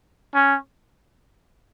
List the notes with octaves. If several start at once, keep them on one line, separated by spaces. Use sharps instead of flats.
C#4